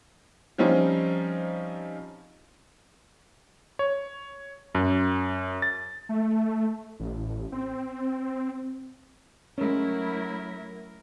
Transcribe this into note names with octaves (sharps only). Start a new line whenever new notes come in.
F3 G3 C4 C#4 D#4 F4
C#5
F#2
A6
A3
A1
C4
F#3 G#3 A3 C#4 E4 A#4